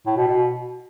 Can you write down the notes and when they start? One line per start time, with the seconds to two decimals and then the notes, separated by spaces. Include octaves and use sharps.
0.07 A2
0.17 B2
0.28 B2